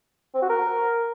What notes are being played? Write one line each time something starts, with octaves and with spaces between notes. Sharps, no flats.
C4
F#4
A#4